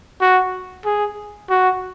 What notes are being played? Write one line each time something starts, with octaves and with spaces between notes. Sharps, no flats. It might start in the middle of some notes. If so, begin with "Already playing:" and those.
F#4
G#4
F#4